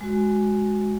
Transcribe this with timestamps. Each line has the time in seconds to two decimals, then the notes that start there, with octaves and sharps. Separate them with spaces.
0.01 G#3 F#4